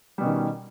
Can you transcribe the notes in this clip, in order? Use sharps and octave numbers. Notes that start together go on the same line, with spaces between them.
B2 D#3 G3 C#4